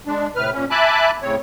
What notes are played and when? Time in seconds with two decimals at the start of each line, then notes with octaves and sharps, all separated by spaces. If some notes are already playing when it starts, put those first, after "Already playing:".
0.07 G#3 D4
0.36 A2 C3 B4 F6
0.53 A#2 C#4
0.70 E5 G#5 A5 B5 D6 F#6
1.22 A2 C#3 C4 C#5